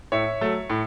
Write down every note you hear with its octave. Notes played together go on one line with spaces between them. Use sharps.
A2 C#5 E5
F#3 A3
A2